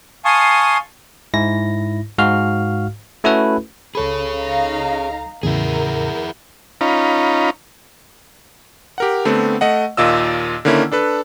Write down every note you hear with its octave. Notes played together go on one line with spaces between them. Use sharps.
F5 G#5 A5 C6 C#6 D#6
G#2 E4 A#6
G#2 F#4 F5 F6
A3 C#4 E4 F#4 A4 B4
C#2 G#4 A4 C#5 B5
D#4 F5 A#5
E2 A2 C#3 E4 G#4 A#4
C#4 D#4 F4 A#5 B5
G4 A#4 F#5
D3 A3 B3 C4
A3 D#5 F#5
D#2 A#2 F4 D#5 E6
D3 D#3 A#3 C#4 E4
D4 A4 B4